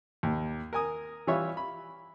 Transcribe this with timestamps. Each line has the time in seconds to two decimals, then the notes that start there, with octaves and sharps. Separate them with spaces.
0.23 D#2
0.73 A#4 G#5 D#6
1.27 E3 G3 F4 C#5 E5
1.57 B5